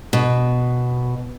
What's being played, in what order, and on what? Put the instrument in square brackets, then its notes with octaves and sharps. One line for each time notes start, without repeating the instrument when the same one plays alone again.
[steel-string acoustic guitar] B2